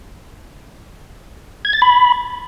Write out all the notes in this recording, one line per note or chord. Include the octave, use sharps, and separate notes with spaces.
G#6
A6
B5